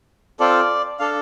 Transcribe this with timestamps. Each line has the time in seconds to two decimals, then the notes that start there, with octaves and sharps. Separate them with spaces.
0.40 C4 F4 A4 D5
1.00 D4 A4 F5